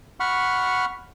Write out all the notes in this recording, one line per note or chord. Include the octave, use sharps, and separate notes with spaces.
F#5 B5 C#6 F6